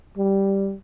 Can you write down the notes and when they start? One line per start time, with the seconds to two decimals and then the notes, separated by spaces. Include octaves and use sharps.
0.18 G3